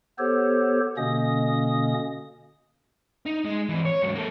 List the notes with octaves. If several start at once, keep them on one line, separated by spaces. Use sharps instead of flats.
B3 G4 A4 C5 C#5
B2 D3 A#3 C#4 D#5 D#6
D#4
G#3
E3 C4
C#5
G#2 F#3
A#3 A4